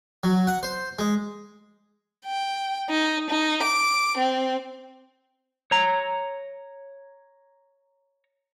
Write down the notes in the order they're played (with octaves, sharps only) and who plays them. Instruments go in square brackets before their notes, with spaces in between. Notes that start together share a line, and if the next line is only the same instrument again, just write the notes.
[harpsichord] F#3
F#5
C5
G#3
[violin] G5
D#4
D#4
D6
C4
[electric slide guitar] C#5 A#5